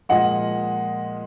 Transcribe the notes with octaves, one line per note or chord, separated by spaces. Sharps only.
A#2 F3 G#3 D#5 F#5